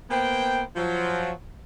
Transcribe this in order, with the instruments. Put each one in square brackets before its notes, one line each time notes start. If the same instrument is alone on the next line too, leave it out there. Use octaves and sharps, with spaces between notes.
[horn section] A#3 B3 C5 G5
F3 F#3